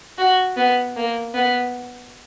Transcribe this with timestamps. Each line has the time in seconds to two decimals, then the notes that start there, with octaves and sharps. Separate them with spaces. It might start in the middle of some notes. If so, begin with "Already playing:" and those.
0.18 F#4
0.57 B3
0.96 A#3
1.34 B3